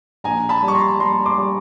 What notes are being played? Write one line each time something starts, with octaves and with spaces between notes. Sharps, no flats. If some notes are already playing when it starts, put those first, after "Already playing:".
A#1 G#5 A#5
A5 B5
G3
C#6
A#5 C6
G3 A#5 C6
C6 D6
G3